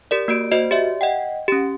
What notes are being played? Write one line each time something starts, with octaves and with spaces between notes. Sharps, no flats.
G4 A#4 D5
A#3 F#4 D5 D7
F#4 C5 D#5
G4 D5 E5
D#5 F#5 G5
C#4 G4